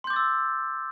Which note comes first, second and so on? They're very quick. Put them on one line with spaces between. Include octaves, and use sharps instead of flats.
C6 G6 D6 A6 E6